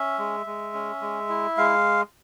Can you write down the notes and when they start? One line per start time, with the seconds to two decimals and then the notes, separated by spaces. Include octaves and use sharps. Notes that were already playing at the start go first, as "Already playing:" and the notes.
Already playing: C#4 E5
0.19 G#3
0.46 G#3
0.74 C#4
1.02 G#3
1.29 E4
1.57 G#3 F5